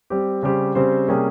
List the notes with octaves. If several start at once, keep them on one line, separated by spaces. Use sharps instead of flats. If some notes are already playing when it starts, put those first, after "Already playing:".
G3 C4 G4
C#3 G3 C4 G4 C5
C#3 G3 C4 G4 C5
C3 G3 A#3 C#4 G#4